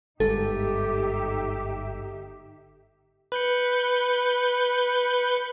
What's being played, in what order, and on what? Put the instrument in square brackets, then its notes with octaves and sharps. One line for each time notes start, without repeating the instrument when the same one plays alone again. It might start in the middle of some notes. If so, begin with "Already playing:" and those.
[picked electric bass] G1 G#2 [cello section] D#4 G4 E5 [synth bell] A4
[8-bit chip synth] B4 G6 C#7